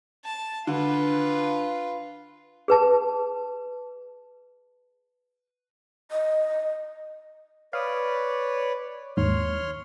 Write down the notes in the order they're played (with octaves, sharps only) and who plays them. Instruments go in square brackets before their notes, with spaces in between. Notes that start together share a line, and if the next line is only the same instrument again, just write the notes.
[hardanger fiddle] A5
[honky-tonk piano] D3 [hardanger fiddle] F4 B4
[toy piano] G#4 B4 A5
[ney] D#5
[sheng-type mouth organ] B4 C#5 D5 [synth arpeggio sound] F5 D#6
[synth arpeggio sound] D#2 G#2 [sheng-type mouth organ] C#5 C6 F6